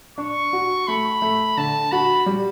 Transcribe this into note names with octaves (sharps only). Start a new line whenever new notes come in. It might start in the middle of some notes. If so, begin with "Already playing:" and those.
D4 C#6
F#4
A3 B5
A3
D3 A5
F#4 B5
G3